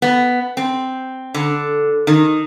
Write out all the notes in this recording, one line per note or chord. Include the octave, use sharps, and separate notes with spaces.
B3
C4
D3
D#3